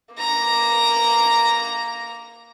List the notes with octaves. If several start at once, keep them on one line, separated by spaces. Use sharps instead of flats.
A#3 A#5